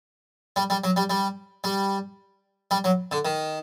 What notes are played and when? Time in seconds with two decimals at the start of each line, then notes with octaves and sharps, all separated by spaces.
0.56 G3
0.70 G3
0.84 F#3
0.96 G3
1.10 G3
1.64 G3
2.71 G3
2.84 F#3
3.11 D3
3.25 D#3